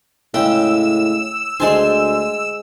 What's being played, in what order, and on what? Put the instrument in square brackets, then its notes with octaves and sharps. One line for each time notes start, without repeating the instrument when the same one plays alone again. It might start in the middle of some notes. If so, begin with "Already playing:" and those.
[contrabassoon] A2 [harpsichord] C#3 G#3 [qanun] G5 [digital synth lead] E6
[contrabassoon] D2 [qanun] G#3 C5 [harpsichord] G#5 A5